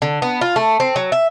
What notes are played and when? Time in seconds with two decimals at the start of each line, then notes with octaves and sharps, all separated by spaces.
0.02 D3
0.22 B3
0.41 F4
0.56 A3
0.80 C4
0.96 F#3
1.12 E5